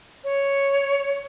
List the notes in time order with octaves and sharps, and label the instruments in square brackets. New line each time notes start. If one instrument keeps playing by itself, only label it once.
[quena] C#5